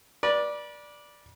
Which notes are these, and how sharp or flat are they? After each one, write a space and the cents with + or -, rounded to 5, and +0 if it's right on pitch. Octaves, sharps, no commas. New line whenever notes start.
B4 -40 D5 +0